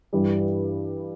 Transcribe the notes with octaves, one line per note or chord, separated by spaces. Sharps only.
G2 E3 G3